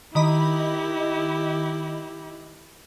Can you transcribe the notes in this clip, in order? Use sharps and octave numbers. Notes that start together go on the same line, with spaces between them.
D#3 E4 G4 D#5 B5